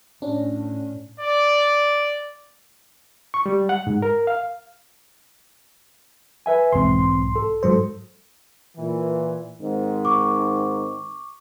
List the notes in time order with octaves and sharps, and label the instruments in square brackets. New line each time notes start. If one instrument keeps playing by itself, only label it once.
[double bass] A2 [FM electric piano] C#4 D4
[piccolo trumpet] D5
[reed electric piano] C#6
G3
F#5
G#2
A#4
F5
B4 E5 G#5
[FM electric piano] B1 G#2 C6 [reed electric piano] E2 E3 C4
[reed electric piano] A4
[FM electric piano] G#2 F#3 C5 [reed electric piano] A4
[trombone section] A#2 E3
G#2 D#3 C4
[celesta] C#6 D6